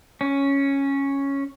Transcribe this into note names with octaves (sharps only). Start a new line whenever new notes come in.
C#4